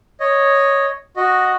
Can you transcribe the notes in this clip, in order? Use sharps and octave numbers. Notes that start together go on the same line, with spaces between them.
C#5 D#5
F#4 D#5